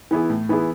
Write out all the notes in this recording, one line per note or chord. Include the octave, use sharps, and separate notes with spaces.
E3 B3 E4 G#4
A2
E3 B3 E4 G#4